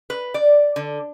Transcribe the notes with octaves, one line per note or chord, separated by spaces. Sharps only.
B4
D5
D3